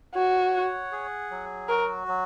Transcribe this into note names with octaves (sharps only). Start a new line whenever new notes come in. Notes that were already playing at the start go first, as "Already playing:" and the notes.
F#4 C#5
F#5
G#4
F#3
F#4 A#4
F#3